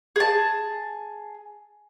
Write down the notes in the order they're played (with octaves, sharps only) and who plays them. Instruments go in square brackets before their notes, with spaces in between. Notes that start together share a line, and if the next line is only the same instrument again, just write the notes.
[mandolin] G#4 A5